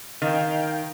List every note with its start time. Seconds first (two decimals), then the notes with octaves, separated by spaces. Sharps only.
0.22 D#3 F5 G5